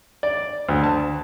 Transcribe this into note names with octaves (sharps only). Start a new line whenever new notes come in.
D5
D2
A5